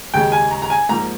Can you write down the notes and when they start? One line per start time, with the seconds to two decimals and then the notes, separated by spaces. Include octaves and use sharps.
0.14 D#2 C#3 G#3 G5
0.32 G#5
0.51 A#5
0.62 A#5
0.70 G#5
0.89 G#2 F3 A#3 A#5